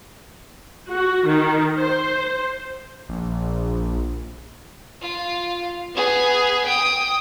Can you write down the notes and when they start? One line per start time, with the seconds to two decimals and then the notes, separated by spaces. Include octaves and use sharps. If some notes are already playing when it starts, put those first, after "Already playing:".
0.90 F#4
1.27 D#3
1.78 C5
3.09 A#1
5.01 F4
5.94 B3 G#4
6.66 G5 D#6